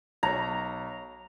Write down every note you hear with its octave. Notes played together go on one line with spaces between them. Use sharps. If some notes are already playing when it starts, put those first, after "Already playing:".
B1 C#5 A#5